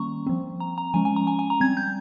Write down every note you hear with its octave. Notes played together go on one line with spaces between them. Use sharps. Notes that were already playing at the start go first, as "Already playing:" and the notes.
Already playing: D#3 G3 A#3 C#4 A#5 C#6
F3 C4
A#5
A#5
F3 G#3 C#4 G#5
G#5
A#5
G#5
G#5
A#5
G3 C4 G#6
G6